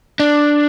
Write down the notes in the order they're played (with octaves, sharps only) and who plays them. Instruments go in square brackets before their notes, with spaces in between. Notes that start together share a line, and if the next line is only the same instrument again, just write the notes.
[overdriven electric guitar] D4